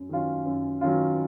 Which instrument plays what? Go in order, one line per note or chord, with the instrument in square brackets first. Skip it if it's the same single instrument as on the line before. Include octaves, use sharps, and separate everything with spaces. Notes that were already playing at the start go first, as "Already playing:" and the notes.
Already playing: [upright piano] F#2
D#3 F#3 C#4 F4
F#2
D#3 F#3 C#4 F4